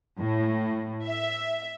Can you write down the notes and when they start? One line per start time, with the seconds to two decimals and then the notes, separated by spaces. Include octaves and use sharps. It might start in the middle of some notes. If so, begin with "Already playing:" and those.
0.19 A2
1.06 E5